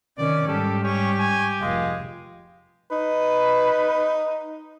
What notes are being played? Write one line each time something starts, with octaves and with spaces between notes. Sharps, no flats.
C3 D#3 C#4 D5
G#2 G3 G4 A4
C#4 G4 C#6
G#5
F1 G#3 F5
D#4 B4